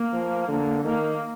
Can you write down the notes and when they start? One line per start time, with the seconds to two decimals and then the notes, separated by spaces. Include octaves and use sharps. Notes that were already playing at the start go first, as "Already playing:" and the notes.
Already playing: A#3
0.12 F3
0.48 D3
0.83 D#3 A#3